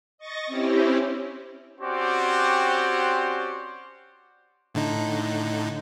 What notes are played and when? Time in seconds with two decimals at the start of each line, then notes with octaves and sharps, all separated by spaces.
0.18 D#5 C#6 A6 A#6
0.46 C4 C#4 E4 G4
1.80 C4 C#4 F#4 G4 C5 D5
4.75 A2 D3 D#4